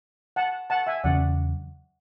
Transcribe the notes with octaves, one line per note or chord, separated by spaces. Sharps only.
F#5 A5
F#5 A5
E5 G#5
E2 C#3 F#3 C#4 D5 F#5